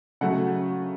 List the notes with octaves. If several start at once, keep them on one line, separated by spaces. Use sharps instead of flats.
C#3 F#3 A3 F#5